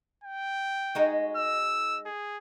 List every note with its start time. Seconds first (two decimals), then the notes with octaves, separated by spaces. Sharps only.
0.24 G5
0.95 G#3 D#4 F#4
1.36 E6
2.05 G#4